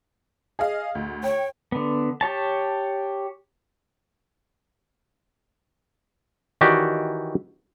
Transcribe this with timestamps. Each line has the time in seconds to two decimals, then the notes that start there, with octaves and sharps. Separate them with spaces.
0.59 G#4 D#5 F5
0.95 D2
1.24 C#5 G5
1.72 D3 B3
2.21 G4 C#5 A5
6.61 D#3 E3 F#4 G4 C#5 D5